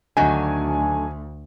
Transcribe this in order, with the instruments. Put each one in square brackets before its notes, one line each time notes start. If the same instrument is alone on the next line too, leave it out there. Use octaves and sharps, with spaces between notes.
[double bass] D2 [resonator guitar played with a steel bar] D3 D#3 F#3 [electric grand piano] G#5